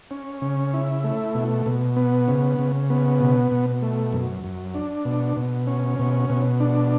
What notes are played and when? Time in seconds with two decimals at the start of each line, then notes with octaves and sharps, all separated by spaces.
0.11 C#4
0.42 C#3
0.74 E4
1.04 A3
1.35 B2
1.66 B2
1.96 B3
2.28 C#3
2.59 C#3
2.90 B3
3.20 B2
3.52 B2
3.82 A3
4.12 F#2
4.44 F#2
4.74 D4
5.05 B2
5.37 B2
5.67 C#4
5.99 B2
6.30 B2
6.60 D4